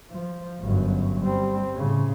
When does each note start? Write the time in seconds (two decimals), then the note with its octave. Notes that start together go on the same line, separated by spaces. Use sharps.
0.11 F3
0.61 G1 F#2
1.20 G3 C4
1.75 A2 C#3